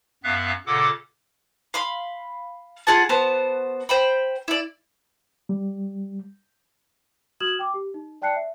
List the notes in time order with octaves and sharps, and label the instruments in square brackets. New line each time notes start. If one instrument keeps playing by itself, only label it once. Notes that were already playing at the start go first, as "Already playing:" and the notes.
[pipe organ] F#2 B3 E5 F5 F#6
A#2 C#3 A4 F#5 D6
[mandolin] F5 B5 C6
F4 G#4 F#5 A5
B3 F#4 C5 A5
C5 G5 B5
E4 D5
[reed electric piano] G3
[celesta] F#4 D#6 F6 G#6 E7 F#7
G5 D6
G4
D#4
D5 G5 A5 F#6 C7 C#7
E5